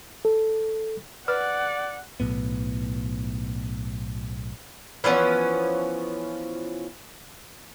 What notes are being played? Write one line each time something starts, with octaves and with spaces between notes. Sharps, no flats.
A4
B4 D5 F#5
B1 A2 B3
E3 F3 B3 C#4